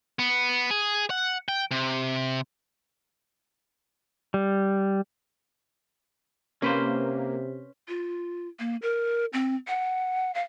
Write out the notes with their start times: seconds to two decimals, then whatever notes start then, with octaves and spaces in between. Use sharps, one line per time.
0.19 B3
0.71 G#4
1.10 F#5
1.49 G5
1.71 C3
4.34 G3
6.62 C3 A#3 C#4 B4 C5
7.88 F4
8.59 A#3
8.82 A#4
9.33 C4
9.68 F#5
10.35 F5